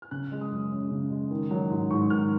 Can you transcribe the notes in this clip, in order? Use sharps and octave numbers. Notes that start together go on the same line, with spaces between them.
F6
C#3 F#6
G#3
D#6
F#2
F#2
C#3
G#3
D#3
F#3
G#2
G#2 C#6
D#3 F6